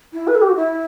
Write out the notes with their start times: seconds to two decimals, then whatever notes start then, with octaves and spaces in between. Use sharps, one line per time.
0.13 E4
0.28 B4
0.35 A4
0.42 G4
0.49 F#4
0.56 E4